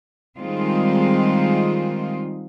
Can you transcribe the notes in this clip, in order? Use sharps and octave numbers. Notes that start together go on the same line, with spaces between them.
D#3 G3 G#3 C4 D#4 F4